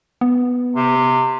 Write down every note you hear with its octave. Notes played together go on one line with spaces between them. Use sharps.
B3
C3